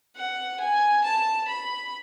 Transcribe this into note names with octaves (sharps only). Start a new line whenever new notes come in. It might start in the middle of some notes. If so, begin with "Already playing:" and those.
F#5
G#5
A5
B5